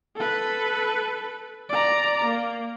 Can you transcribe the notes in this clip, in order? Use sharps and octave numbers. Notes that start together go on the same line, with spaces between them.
A4 B4
D5 A#5
A#3